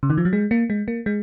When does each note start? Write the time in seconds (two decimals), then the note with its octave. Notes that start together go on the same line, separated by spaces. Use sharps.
0.03 C#3
0.10 D#3
0.18 F3
0.25 F#3
0.33 G#3
0.51 A#3
0.70 G#3
0.88 A#3
1.06 G#3